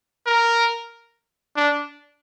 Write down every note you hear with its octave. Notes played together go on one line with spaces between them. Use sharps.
A#4
D4